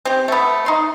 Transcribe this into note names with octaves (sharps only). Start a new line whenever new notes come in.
C4 G4
A3 B3
D#4 C6